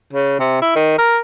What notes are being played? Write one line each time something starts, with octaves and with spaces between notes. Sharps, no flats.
C#3
C3
E4
D#3
A#4